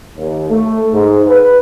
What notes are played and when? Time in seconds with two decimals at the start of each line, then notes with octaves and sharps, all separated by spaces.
0.15 D#2
0.50 A3
0.92 G#2
1.26 B4